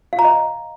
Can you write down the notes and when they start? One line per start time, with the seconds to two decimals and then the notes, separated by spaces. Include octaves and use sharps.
0.13 F5
0.19 A#5
0.25 D#5